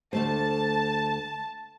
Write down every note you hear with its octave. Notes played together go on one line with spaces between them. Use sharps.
D2 A3 C5 A5